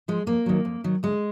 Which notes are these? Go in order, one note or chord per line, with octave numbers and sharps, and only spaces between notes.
F3 G#3
F2 A#3
D#3 F#3
F2
D#3 F#3
D2 G#3